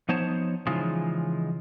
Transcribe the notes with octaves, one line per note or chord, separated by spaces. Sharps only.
F3 B3 D#4 C5 C#5 A5
C#3 E3 F3 G#3 D#4 F4